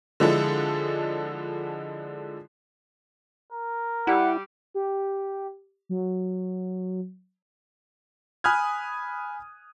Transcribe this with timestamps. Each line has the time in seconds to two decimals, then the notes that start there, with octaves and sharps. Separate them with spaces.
0.20 D3 F3 G#3 D4 E4 A4
3.52 A#4
4.07 G3 E4 G4 F#5
4.74 G4
5.89 F#3
8.44 G#5 B5 D#6 F6 F#6 G#6